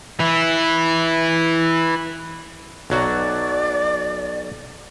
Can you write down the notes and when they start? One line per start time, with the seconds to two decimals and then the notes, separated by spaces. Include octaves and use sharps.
0.20 E3 E4
2.90 B1 F#3 F#4 D5